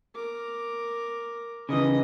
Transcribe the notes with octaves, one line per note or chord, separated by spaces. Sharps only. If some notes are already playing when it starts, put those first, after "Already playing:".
A#4 D6
C#3 E3 D#5 D#6